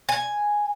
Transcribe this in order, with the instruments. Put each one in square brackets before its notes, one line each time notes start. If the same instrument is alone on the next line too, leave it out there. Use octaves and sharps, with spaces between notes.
[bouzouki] G#5